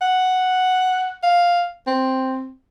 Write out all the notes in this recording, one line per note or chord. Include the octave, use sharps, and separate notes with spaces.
F#5
F5
C4